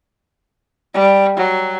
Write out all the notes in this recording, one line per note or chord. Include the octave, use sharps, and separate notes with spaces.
G3
F#3